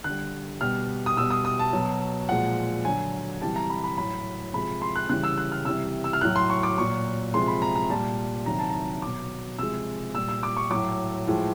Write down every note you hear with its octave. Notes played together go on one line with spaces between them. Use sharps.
D3 G3 F#6
B2 G3 F6
D#6
B2 G3 E6
D#6
D#6
A5
B2 F#3
A#2 F3 G#3 F#5
D3 F#3 G#5
C3 E3 G3 A5
A#5
B5
B5
A2 F#3 B5
C3 F3 G#3 B5
C6
F#6
C#3 E3 G3 F#6
E6
F#6
F6
C3 E3 G3 E6
E6
F6
A2 F#3 F#6
C6
C#6
D6
A#2 F#3 C#6
C3 F3 G#3 C6
B5
A#5
A#5
A#2 G3 A5
C3 D#3 F#3 A#5
A5
A#5
B2 F#3 D6
C3 F3 G#3 E6
A#2 G3 E6
E6
D6
C#6
A2 F#3 D6
A2 F3 G#3